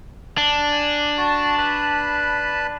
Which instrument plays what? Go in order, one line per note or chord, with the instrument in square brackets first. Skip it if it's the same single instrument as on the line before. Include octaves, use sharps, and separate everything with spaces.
[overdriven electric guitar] D4
[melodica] G#5
F#4 A5
B4 A5 B5